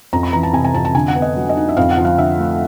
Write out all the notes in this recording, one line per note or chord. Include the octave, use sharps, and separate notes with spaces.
F2 A#5
B5
E3 A#5
A5
C3 G#5
G#5
F2 A5
A5
D3 G#5
F#5
B3
D#5
F#3
D#5
D#4
E5
F2 F5
F#5
F3
F5
D3 E5
A3